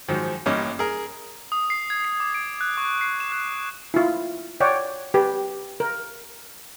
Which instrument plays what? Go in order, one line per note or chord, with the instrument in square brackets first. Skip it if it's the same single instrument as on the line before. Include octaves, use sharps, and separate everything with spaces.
[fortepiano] G#2 D#3 F3 F#3
A1 G2 A#3 C#4 D#4 D#5
G#4 A#4
[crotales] D#6
C7
G#6
C7
D6
D7
F#6
C#6
C7
E7
F#6
[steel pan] E4 F4
C#5 D5 F#5 G5
G4 B4
A#4